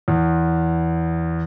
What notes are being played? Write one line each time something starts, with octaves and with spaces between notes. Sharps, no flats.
E2